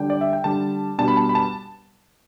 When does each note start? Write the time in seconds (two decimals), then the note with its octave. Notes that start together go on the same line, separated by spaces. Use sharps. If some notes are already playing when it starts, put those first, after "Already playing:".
Already playing: D3 G3 D4 G5
0.10 D5
0.21 E5
0.33 G5
0.44 D3 G3 D4 A5
0.98 B2 G3 B3 D4 A5
1.08 B5
1.17 A5
1.29 B5
1.35 A5